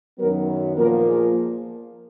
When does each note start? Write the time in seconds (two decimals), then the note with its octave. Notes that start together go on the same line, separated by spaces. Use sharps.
0.19 F#2 D#3 F#3 B3 A#4
0.77 A#2 F3 A#3 A#4
1.06 G#4